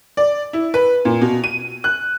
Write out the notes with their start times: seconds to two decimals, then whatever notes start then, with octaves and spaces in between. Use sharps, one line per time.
0.17 D5
0.53 E4
0.74 B4
1.05 A#2
1.22 B2
1.44 D#7
1.84 F#6